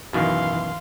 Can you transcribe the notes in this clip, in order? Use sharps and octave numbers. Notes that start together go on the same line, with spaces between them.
F#2 B2 D#3 E3 F5 C6